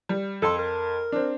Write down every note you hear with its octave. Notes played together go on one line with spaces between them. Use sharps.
G3
F2 A4 C6
A#4
C4 D4